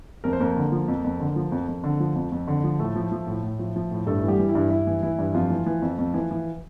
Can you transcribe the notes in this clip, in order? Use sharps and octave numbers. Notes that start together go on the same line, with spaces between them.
F2 A#4
C5
F2 A#3 A#4
D3
F3
F2
F2
D3
F3
F2
F2
D3
F3
F2
F2
D3
F3
A2 A3 A4
F3
F3
A2
A2
F3
F3
A2
G2 A3 A4
E3
G3 G4
E3
E4
G2
G2 E4
E3
E3 E4
G2
F2 F3 F4
E3
E3
F2
F2
E3
E3